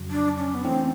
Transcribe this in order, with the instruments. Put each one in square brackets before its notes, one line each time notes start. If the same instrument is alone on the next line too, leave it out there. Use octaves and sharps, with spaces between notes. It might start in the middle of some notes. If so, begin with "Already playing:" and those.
Already playing: [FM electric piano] F2 C#3 F#3
[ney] D4
C#4
B3
[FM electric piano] E3 A3 C#4 E4 [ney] C4